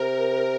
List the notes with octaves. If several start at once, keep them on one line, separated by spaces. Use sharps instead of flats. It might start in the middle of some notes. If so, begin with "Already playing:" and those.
Already playing: C3 A#4